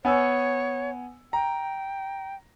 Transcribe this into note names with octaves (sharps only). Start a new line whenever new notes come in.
B3 C#5 G#5 E6
G5 A#5